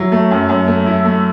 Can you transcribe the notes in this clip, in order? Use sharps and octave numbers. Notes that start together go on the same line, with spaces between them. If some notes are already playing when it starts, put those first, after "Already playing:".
Already playing: F#3 E4
A3
F#2
F#2
A3
E4
A3